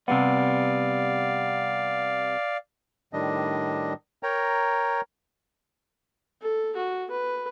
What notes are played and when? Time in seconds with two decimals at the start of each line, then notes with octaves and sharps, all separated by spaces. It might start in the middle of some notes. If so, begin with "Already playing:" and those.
0.08 C3 G3 B3 D5 F5
3.13 A2 D#3 G3 D4 D#5
4.23 A#4 C#5 G5 A#5
6.42 A4
6.77 F#4
7.11 B4